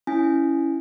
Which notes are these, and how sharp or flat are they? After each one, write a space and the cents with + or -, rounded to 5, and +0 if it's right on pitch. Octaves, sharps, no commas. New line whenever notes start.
C#4 +0 E4 +0 G#5 +0